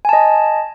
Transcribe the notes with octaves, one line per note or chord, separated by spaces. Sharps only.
D#5 G#5 A5